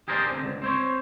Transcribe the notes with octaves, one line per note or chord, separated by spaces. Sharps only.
G4 G#4 A#4 C5 D5
D3 C4
C#2
C4 C5 C#5